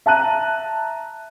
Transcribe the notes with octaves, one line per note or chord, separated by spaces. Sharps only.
E5 A5 A#5 F#6 D#7